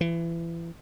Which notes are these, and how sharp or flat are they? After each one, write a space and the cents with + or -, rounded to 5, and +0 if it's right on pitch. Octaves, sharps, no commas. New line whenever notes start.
E3 +30